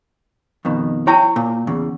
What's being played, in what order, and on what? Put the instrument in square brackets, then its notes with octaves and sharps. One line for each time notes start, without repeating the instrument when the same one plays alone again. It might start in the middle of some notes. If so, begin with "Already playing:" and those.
[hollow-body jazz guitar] F2 B2 D#3
[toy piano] E4 A5 [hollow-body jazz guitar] C#5 G5 A#5
[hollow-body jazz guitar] A#2
E2 C#3